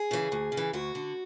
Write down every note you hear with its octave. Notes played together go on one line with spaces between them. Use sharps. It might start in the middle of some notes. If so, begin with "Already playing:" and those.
Already playing: G#4
C#3 E3
D2
C#3
E3
D2 F#4
D3